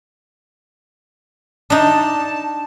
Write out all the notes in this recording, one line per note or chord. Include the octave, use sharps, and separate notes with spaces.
D4 D#4 A5